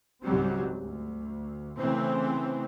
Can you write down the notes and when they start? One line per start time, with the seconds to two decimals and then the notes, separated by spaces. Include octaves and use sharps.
0.23 C#2 G#2 F#3 G3 C4
0.82 D2
1.78 C#3 E3 A3 C4